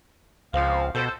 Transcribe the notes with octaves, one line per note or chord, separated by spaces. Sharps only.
C#2 F3 C4 F5
B2 A4 C5